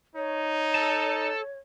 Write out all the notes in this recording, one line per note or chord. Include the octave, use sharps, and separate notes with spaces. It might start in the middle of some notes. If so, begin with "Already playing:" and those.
D#4 C#5
A4 A5